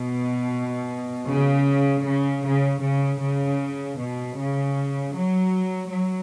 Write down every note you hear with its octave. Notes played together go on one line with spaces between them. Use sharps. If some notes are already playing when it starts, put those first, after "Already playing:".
Already playing: B2
C#3
C#3
C#3
C#3
C#3
B2
C#3
F#3
F#3